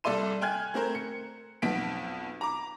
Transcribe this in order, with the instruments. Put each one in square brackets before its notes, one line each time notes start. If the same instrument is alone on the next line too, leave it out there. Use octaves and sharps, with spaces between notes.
[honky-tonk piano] C2 A4 D5 E5 C6 D#7
G5 G#5 F6 F#6 G#6
A3 C4 A#4 C5
C#7
B1 F2 B3 B6 D7
A#5 D6